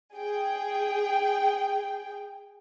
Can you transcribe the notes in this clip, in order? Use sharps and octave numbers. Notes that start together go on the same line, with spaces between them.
G#4 G5